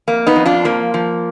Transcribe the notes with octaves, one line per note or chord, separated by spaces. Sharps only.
F2 A#3
B3 D#4
F2
D4 F4
F3 A#3
F3